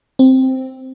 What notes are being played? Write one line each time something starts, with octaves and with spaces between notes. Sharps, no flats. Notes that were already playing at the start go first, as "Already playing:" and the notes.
C4